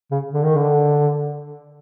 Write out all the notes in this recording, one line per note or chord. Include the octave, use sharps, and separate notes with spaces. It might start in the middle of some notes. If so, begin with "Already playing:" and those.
C#3
D3
D#3
D3